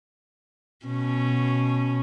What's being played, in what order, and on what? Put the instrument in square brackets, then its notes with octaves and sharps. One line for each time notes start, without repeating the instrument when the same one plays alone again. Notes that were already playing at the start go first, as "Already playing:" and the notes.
[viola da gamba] B2 C#4